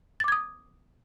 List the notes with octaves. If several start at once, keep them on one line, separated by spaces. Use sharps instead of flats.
D6 D#6 G#6 A6